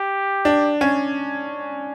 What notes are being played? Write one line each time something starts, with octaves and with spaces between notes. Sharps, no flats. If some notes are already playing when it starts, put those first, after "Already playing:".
Already playing: G4
D4
C#4